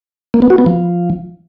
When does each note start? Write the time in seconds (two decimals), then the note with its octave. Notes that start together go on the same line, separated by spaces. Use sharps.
0.34 A#3
0.42 B3
0.50 F#4
0.58 B3
0.66 F3